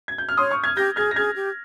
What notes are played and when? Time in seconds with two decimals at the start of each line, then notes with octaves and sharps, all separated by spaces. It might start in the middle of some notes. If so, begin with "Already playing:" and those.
0.08 G#6
0.18 G6
0.29 F6
0.38 C#5 C6 D#6
0.51 C#6 F6
0.64 F6 G#6
0.77 G4 G6 A#6
0.96 G#4 F6 G#6
1.11 A#6
1.16 G#4 F6 G#6
1.36 G4